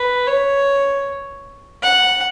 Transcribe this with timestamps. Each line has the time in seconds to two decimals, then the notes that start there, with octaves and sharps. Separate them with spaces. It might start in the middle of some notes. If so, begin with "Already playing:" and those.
Already playing: B4
0.27 C#5
1.82 F#5